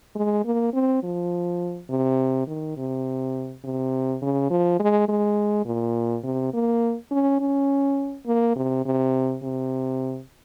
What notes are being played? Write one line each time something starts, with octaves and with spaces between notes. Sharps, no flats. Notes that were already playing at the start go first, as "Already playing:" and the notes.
G#3
A#3
C4
F3
C3
D#3
C3
C3
C#3
F3
G#3
G#3
A#2
C3
A#3
C#4
C#4
A#3
C3
C3
C3